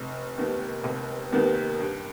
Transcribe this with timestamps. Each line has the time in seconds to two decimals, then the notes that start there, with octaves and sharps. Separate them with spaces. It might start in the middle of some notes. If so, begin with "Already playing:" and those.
Already playing: F1
0.38 D#2 D#3 B3
0.84 F1
1.32 D#2 D#3 B3
1.80 G2